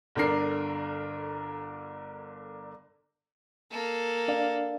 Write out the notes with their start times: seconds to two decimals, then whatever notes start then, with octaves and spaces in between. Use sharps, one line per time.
0.15 G1 D3 D4 A#4 C7
3.71 A#3 A4
4.28 D4 D5 F5